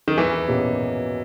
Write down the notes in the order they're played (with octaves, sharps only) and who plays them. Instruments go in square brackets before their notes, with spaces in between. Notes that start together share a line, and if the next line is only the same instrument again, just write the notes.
[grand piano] D#3
[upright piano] E2 [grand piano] E3
[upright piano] B2 A#3 C#4 G4